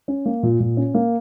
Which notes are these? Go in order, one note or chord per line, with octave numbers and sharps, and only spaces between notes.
C#4
A#3
A#2
A#2
C#4
A#3